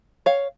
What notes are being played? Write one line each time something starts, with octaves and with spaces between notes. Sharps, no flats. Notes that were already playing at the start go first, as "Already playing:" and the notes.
C#5 F5